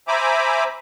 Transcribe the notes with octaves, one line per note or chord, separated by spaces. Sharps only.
C5 E5 G#5 A#5 B5 D6